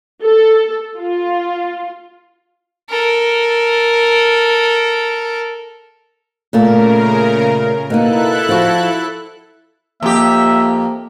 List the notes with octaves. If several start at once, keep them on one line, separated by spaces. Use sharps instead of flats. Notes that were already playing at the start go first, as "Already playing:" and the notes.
A4
F4
A4 A#4
A#2 C#3 A3 A#3 A#4
B2 A#3 D#4 E4 A4 F#6
F3 F#4
F2 A#3 G4 E5